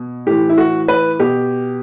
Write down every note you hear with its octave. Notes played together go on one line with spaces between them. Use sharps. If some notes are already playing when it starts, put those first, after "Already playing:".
Already playing: B2
A2 E3 G4
E4
F#4
B4
B2 G4